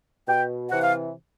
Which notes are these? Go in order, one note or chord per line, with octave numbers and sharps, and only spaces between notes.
B2 G5
C3 E3 F#5
F5